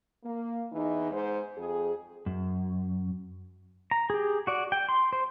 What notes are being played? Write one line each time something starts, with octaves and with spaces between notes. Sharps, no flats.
A#3
E2 E3 D#4
G#2 C5
F2 G#4
F#2
A#5
G4 G#4
F#4 D5
G5
C6
C5